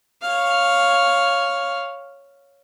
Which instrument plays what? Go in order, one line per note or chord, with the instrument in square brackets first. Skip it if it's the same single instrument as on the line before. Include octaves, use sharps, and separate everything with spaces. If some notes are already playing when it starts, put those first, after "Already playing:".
[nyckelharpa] C#5 F5